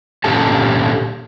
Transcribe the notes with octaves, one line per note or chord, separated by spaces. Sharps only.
A#2 D3 C#4 G4 A4 A5